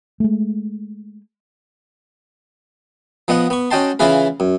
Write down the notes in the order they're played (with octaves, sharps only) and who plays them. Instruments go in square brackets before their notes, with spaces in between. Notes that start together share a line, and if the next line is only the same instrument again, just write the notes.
[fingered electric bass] G#3 A3
[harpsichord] F3 B3 D#5 F#5
B3 C#6
C#4 F#4 D#5 G5 A5 C6
C#3 E3 E4 F4 G#4 B4
F#2